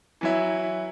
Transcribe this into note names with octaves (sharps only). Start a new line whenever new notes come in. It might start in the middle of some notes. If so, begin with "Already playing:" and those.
E3 F#3 E4